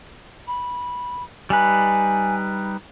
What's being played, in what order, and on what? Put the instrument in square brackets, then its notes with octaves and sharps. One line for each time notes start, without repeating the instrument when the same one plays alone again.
[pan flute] B5
[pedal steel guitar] G3 D#4 B4 [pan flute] G#5